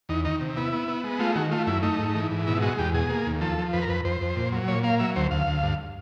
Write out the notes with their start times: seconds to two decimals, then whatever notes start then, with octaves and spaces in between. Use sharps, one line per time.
0.09 E2 D#4
0.25 D#3 D#4
0.41 C3
0.56 B3 E4
0.73 B3
0.88 B3
1.04 G#3
1.19 A3 F4
1.35 D#3 F#4
1.51 A3 F4
1.67 F#2 E4
1.83 A3 D#4
1.99 G#2
2.15 E3
2.31 G#2
2.47 B2 E4
2.62 G#3 F#4
2.79 E2 G4
2.94 B2 G#4
3.10 A#3
3.26 D#2
3.41 F3 A4
3.58 F3
3.73 F2 B4
3.82 A#4
3.89 F2 B4
4.05 F2 C5
4.21 F2
4.36 A#2
4.52 F#3
4.68 A#2 C#5
4.83 A#3 F5
4.99 F#3 E5
5.16 D2 C5
5.31 D2 F5
5.47 D2
5.63 G2